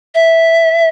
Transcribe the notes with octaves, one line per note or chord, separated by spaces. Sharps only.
E5